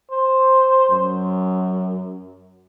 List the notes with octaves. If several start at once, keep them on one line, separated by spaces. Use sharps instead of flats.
C5
F#2